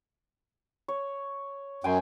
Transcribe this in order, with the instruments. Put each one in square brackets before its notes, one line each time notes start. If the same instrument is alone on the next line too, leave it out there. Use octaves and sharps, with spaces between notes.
[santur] C#5
[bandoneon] F#2 [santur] G5 G#5 C6